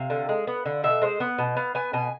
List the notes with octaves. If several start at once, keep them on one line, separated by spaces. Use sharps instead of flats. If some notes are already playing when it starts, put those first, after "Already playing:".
Already playing: C3 F5
D3
G#3
B3
D3
B2 E5
G#3 C5
B3
B2
B3 F5
B3 G#5
B2 G#5